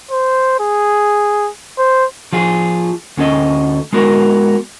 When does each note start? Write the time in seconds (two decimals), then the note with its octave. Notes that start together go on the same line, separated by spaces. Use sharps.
0.11 C5
0.60 G#4
1.78 C5
2.33 F3 F4 G#4
3.17 D2 C#4 A4 D#5
3.93 G#3 B3 F#4 A#4